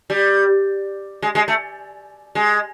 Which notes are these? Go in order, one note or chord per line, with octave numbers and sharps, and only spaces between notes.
G3
G#3
G#3
A3
G#3